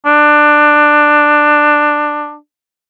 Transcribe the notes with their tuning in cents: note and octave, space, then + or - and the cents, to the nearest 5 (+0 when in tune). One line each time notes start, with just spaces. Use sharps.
D4 +15